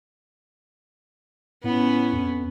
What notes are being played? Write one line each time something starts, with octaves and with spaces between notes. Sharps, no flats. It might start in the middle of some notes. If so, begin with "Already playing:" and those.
A2 B3 C#4
F2